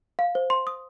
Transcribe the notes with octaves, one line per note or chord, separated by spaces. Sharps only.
F5
C5
C6
D#6